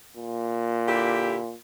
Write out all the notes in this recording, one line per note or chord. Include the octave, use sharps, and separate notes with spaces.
A#2
D3 E4 G4